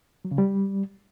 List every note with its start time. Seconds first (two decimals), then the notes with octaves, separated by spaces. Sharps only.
0.25 F#3
0.31 C#3
0.38 G3